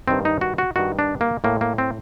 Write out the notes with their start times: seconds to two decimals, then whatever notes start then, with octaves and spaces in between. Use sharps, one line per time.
0.08 G2 D#3 C4
0.25 D#4
0.41 F#4
0.58 F#4
0.76 G2 D#3 F#4
0.99 D4
1.21 A#3
1.44 A2 A#3
1.61 A#3
1.78 C4